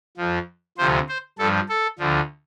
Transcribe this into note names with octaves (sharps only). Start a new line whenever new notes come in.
F2 F3
D2 C3 F3 C5
C5
G2 F3 A4
A4
D2 D3 F3